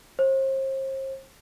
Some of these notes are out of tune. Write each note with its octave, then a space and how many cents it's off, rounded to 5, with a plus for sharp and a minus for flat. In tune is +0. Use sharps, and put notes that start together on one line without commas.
C5 +40